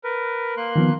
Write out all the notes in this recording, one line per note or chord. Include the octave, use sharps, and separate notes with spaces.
A#4 B4
A#3 C6 F#6
D#3 F3 B3